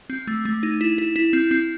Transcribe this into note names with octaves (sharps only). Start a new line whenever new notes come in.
C4
A3
A3
D#4
E4
E4
E4
C4
C4